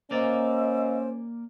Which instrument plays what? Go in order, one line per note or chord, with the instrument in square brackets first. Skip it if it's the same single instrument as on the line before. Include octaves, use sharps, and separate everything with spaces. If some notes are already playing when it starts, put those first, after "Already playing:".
[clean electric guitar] A#3 D5 [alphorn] C#4 [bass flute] C5 [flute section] D#5 F5 E6